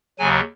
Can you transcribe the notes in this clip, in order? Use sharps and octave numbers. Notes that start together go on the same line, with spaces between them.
D#2 C#3 F#3 G#5